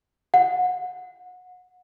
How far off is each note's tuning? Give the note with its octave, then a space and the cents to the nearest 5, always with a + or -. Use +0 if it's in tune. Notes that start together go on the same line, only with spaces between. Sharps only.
F#5 -30